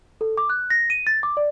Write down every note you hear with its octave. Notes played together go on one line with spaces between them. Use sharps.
A4
D6
F#6
A#6
D#7
A6
D6
D5